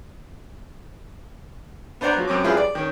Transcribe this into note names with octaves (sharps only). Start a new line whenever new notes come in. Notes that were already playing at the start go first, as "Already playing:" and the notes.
B3 D4 C5 D5 F#5 A#5
F3 F#3
F#2 C4 C#4 D6
F3 G3 E4 F4 G#4 B4
D5
D#3 C#4